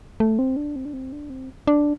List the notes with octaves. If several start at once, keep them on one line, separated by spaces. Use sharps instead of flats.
A3
C4
D4
C4
D4
C4
D4
C4
D4